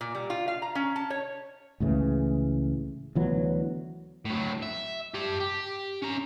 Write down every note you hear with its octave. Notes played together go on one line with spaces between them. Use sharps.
A#2
G3
F4
F5
A#5
C#4
A5
C#5
C#2 A2 C#3 E3
D2 E3 F#3 B3
A2 F#3
E5
G4 A5
G4
C#4 A#5